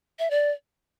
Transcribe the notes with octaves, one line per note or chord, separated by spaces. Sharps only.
E5
D5